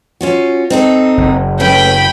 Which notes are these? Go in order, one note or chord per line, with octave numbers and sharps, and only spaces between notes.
C#4 F4 F#4
C4 D#4 A4
F#1
A3 C#4 B4 G5 B5